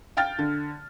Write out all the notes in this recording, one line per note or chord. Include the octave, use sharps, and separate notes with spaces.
F5 G5 F6 A6
D3